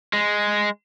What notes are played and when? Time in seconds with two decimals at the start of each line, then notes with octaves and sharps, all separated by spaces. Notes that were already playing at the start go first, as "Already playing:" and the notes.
0.13 G#3